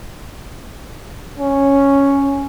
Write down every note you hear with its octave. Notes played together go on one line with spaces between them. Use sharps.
C#4